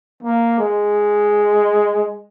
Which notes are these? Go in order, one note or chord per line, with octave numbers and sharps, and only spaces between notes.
A#3
G#3